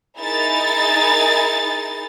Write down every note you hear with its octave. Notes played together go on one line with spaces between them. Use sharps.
D#4 E4 G#4 A#4 A6